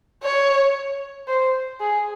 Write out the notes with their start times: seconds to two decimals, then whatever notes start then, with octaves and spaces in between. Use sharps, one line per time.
0.23 C#5
1.28 C5
1.80 G#4